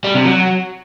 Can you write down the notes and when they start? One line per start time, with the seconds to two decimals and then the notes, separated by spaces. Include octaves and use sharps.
0.04 G3
0.15 C3
0.25 F#3